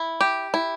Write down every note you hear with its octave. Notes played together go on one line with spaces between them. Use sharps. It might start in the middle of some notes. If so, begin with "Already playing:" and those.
Already playing: E4
G4
E4